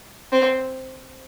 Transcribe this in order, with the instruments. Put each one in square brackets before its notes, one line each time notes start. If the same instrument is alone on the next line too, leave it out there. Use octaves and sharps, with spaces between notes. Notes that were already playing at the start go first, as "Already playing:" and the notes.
[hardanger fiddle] C4